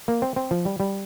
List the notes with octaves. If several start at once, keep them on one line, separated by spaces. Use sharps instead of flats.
A#3
C4
C4
F3
G3
G3